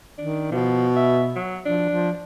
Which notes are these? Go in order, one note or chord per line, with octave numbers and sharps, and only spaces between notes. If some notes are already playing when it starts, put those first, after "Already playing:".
D#3 D4
B2 F3
E5
F#3
F3 D4
F3